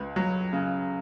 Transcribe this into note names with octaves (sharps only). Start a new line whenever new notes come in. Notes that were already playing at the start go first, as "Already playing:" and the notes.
Already playing: C#2 B4
F#3
C#3